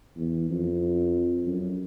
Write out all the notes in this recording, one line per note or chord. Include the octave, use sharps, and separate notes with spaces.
E2
F2
F#2